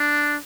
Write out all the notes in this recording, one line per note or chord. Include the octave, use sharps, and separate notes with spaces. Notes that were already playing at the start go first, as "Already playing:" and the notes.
Already playing: D4